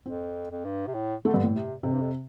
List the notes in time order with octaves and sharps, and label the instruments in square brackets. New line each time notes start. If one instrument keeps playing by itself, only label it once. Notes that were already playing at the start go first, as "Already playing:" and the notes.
[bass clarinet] F2 [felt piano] C4
[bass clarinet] F2
G2
C3
A2
[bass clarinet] D3 [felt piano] A3
[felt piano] G2
A2
[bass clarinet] C3
[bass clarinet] F2 [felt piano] C3
[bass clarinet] G2
F2